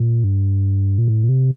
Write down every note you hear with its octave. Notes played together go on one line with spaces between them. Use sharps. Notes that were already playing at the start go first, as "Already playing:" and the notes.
Already playing: A#2
G2
A#2
A2
A#2
C3